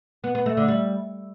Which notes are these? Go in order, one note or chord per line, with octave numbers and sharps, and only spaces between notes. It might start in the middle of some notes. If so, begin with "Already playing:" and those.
B3
B3
A3
D3
G3